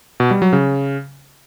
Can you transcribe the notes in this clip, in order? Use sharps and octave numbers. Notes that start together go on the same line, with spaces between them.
B2
G3
F#3
C#3